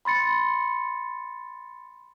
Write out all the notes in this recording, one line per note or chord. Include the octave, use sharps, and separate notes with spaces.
B5 C6 A6 C#7